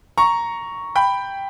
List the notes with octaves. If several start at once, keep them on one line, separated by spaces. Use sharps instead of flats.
A#5 C#6
G5 B5